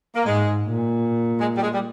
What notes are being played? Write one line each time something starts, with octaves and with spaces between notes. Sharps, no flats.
A#3
G#2 G#3
A#2
G#3
G3
G#3
G3